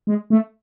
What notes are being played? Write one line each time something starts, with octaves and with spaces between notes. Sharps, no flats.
G#3
A3